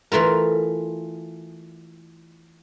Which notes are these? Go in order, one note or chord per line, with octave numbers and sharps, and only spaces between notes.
E3 A3 F4 A#4